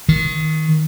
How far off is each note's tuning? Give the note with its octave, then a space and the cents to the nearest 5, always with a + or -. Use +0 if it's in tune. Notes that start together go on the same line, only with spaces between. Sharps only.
D#3 +10